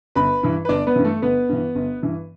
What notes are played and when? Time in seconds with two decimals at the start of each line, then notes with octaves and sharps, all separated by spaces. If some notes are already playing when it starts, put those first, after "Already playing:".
0.15 G1 B4 B5
0.43 G2 E3
0.65 B4
0.69 G1 D4 D5
0.87 B3 B4
0.96 G2 E3
1.04 A3 A4
1.22 G1 B3 B4
1.49 G2 E3
1.75 G1
2.02 G2 E3